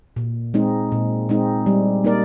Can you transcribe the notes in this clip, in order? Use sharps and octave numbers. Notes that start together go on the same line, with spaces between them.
A#2
G#3 C4 D#4
A#2
G#3 C4 D#4
G3
A#3 D#4 A#4 D5